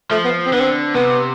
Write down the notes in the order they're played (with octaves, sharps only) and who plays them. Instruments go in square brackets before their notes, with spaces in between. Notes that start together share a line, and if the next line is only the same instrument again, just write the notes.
[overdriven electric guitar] F3 [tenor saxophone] A3
[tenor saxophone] B3
C4
[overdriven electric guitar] D3 [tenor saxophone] B3
[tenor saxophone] C4
[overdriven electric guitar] C3 [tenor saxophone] B3